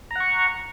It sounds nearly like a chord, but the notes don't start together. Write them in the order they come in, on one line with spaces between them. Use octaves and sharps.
A#5 F#5 C#6